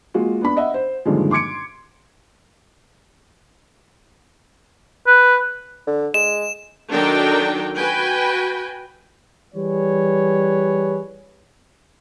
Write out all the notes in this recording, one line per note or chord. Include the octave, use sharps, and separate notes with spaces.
G#3 A#3 F4 F#4
B3 D4 B5
D#5 E5 F#5
C5
G2 A#2 D3 D#3 F3 G#3
C6 D6 G#6 C#7 D7
B4
D3
G#3 E7
D#3 F#3 D4 A4 A#4 G5
F#4 B4 G5 G#5
E3 G3 G#4 B4 C#5